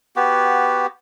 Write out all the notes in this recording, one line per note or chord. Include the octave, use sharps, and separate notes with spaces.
B3 F#4 G4